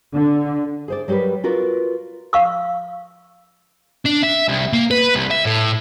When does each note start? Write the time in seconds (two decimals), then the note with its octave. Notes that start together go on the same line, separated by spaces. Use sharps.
0.14 D3
0.88 G#4 C5 D5
1.08 F#3 G3 G4 A#4 B4
1.44 F4 F#4 A#4 B4 D5
2.33 F5 C#6 E6
4.05 D4
4.23 E5
4.48 C2
4.73 A#3
4.91 B4
5.15 C2
5.30 E5
5.45 A2